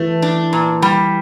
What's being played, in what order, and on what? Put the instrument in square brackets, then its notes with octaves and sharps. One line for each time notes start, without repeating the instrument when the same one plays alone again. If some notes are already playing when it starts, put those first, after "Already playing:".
Already playing: [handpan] E3 [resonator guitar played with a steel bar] A3
[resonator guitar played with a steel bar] D4
A#2
G3